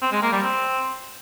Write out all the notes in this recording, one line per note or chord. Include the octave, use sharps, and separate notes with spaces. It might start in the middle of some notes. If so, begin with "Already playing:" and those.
C4
G#3
A#3
G3
C4